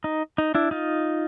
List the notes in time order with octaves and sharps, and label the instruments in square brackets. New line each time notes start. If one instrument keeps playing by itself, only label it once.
[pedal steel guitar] D#4
D#4
D4 E4
D#4 F4